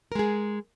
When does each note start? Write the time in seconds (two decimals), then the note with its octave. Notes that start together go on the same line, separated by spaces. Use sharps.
0.12 A#4
0.15 G#3
0.19 G#4